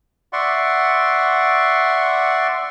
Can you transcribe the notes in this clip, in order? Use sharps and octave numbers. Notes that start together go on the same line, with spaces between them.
D5 E5 F#5 C6 C#6